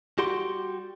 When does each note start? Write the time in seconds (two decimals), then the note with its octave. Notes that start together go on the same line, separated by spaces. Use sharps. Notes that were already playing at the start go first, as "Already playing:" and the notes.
0.18 G3 F#4 G4 F#5 C6